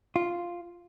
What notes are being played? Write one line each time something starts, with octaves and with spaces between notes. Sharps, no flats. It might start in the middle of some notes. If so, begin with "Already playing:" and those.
F4